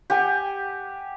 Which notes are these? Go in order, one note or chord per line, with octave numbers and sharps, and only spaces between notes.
G4 F#5 G#5